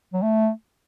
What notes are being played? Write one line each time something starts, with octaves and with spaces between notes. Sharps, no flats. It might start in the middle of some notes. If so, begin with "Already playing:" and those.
F#3
A3